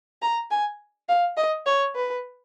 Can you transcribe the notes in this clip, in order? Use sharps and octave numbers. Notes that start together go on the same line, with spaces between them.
A#5
G#5
F5
D#5
C#5
B4